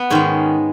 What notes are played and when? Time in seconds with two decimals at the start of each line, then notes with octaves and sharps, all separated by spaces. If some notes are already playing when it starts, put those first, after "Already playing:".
Already playing: B3
0.10 G#2 D#3 G#3 C#4